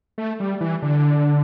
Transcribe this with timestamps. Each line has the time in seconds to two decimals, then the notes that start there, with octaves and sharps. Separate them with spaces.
0.18 A3
0.40 G3
0.61 E3
0.82 D3